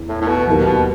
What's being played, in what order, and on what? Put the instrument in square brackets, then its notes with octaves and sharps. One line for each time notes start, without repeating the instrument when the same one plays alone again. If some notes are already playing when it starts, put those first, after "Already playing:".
Already playing: [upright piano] E2
[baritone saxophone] A2
A2
B2
[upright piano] D#2 D#3 F#3 [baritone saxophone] B2
[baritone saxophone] B2